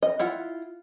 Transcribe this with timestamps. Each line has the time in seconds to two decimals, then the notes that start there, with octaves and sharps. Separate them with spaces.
0.03 D#5
0.19 E4 F4 F#5